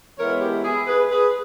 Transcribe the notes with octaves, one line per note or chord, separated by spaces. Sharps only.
E3 G#3 B3 E4 A#4 C#5
G4
E4 G#4
G#4 B4
G#4 B4